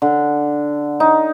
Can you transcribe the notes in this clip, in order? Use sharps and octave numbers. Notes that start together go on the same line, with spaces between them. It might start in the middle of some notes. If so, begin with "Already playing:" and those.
D3
D#4